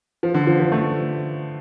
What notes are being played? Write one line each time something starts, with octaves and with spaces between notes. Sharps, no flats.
F3
D3
F3
F3
A3